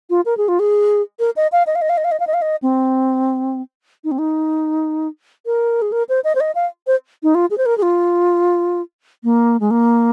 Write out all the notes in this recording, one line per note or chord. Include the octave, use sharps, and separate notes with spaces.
F4
A#4
G#4
F4
G#4
A#4
D#5
F5
D#5
F5
D#5
F5
D#5
F5
D#5
F5
D#5
F5
D#5
C4
D#4
C4
D#4
A#4
G#4
A#4
C5
D#5
C5
D#5
F5
C5
D#4
F4
G#4
C5
A#4
G#4
F4
A#3
G#3
A#3